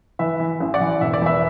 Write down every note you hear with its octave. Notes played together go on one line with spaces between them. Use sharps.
E3 B4 E5
E3
A1
D5 F#5
E3
E1 E5
D5
E2 B4 E5